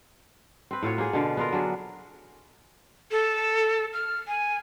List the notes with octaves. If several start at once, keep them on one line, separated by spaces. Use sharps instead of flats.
C4 B4
A2 F4 F#4 C#5
A#3 G#4
B2 D3 F5
B3 F4 A#4
F#3 D4 G#4
A4
F6
G#5